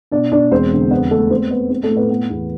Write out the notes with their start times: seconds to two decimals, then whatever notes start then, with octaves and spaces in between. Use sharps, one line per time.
0.12 B2 D4 D5
0.32 B2 D4 D5
0.51 E1 C4 C5
0.72 D3
0.91 F2 B3 B4
1.11 A3 A4
1.30 B3 C4 C5
1.51 B3 B4
1.70 B3 C4
1.83 A3 A4
1.90 A2
1.96 B3 B4
2.10 B3
2.30 E2